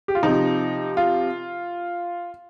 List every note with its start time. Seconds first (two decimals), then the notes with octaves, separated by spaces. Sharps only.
0.08 G4
0.15 F4
0.23 C3 F3 D#4
0.97 F4